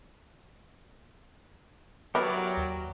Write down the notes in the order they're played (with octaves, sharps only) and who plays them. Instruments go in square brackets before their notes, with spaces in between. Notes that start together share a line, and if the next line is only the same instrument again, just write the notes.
[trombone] F#3 [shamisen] B3 E4 [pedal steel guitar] G4 A#4 D5
[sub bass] D#2